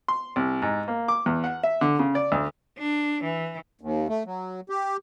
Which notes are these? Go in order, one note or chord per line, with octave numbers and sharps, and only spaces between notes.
C6
C2
G#2
A#3
D6
E2
F#5
E5
D3
C#3
D5
D2
D4
E3
D#2
A3
F#3
G4